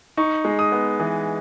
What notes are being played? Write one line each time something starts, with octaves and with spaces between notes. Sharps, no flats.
D#4 C#6
G#3
D#6
B3
E3